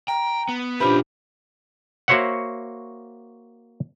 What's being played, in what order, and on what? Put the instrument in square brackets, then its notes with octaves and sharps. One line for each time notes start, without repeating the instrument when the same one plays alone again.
[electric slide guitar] G5 [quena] A#5
[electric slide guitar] B3
[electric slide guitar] A#2 C#4 E4 [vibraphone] D4 F4 G4 [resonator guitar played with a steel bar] B4 [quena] C5
[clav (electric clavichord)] A#3 F#4 C5 C#5 E5 F#5